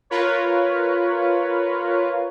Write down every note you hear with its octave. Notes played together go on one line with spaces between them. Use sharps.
F4 A#4 B4 C#5